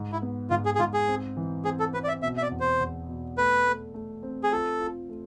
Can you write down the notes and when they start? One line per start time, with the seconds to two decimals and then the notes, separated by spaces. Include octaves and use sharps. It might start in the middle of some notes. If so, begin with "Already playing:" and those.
Already playing: G#2
0.12 E4
0.22 B3
0.50 G#2 F4
0.65 G#4
0.75 G#4
0.79 G#2 F4
0.94 G#4
1.08 C4
1.37 E3
1.65 C4 G#4
1.80 A4
1.94 C4 B4
2.04 D5
2.08 E5
2.22 B2 E5
2.37 E5
2.42 D5
2.51 E2
2.61 C5
2.80 E2
3.09 B2
3.38 A3 B4
3.67 A3
3.94 A3
4.23 C4
4.43 G#4
4.52 F4 A4
4.80 F4
5.09 A3